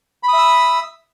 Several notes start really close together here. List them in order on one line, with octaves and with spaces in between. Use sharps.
B5 D#6 E5 E6